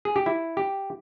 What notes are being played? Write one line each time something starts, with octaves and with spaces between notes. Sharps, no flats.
G#4
G4
E4
G4